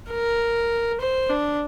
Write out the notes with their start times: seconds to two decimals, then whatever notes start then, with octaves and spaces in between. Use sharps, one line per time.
0.11 A#4
1.01 C5
1.30 D4